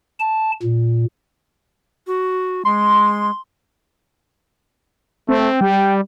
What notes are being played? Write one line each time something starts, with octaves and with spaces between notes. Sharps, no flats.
A5
A#2
F#4
G#3 C6
A3 C4
G3 G5